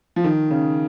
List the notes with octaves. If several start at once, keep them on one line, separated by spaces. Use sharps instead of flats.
F3
D#3
C#3